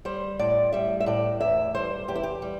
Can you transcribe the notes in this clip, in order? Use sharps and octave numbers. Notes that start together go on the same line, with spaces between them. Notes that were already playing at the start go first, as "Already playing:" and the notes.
G3 C5
A2 D5
G3 E5
E5
A2 D5
E2 E5
G3 C5
E2 G4
E4
G4
G3